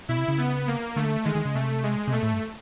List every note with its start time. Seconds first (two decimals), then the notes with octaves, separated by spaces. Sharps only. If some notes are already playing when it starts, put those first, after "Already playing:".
0.09 B2 E4
0.18 C3
0.28 C#3
0.38 B3
0.67 A#3
0.96 D3 A3
1.25 D#3 G#3
1.35 D#3
1.45 C#3
1.55 C3 A3
1.83 G#3
2.08 C3
2.12 B2 A3
2.23 A2
2.33 G2